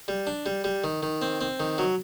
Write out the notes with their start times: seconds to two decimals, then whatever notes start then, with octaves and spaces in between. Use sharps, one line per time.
0.08 G3
0.27 D4
0.46 G3
0.64 G3
0.84 D#3
1.03 D#3
1.22 C4
1.41 C4
1.60 D#3
1.78 F#3